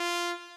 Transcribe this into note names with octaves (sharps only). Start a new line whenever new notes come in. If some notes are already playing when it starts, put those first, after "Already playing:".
Already playing: F4